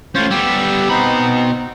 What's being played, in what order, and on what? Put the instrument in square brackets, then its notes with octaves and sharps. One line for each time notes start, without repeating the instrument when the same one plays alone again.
[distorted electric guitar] A2 C#4 [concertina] F4 C5 C#5
[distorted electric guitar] G3 B3 [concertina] G4 E6
[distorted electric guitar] B2 B5 [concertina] B3 C4 D#4